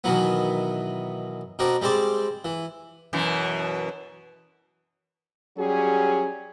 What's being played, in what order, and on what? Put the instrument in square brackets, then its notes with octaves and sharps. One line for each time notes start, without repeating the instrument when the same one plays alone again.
[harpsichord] B2 D#3 E3 F#3 B3
B2 C4 D4 A#4
G3 G#3 C4 C5 D5
E3
[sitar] F#2 B2 E3
[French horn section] F#3 G3 C#4 G4 G#4